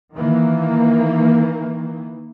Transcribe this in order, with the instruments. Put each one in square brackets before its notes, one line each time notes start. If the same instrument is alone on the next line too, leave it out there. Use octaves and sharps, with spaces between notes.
[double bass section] D#3 E3 A#3